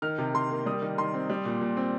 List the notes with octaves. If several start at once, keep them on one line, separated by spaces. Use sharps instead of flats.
D#3 F6
C3
C3 C6
A#3
G3 D#6
D#3
D#3 C6
C4
G3
A#2
A#2
C4